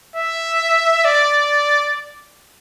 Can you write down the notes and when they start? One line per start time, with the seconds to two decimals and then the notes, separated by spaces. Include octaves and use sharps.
0.16 E5
1.05 D5